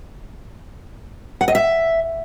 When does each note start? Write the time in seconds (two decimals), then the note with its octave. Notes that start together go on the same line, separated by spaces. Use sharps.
1.41 F#5
1.48 D#5
1.55 E5